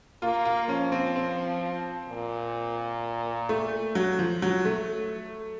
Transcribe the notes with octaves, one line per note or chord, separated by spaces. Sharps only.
A#3 F4
F4
F3 C#4
C4
C4
A#2
A3
F#3
F3
F#3
A3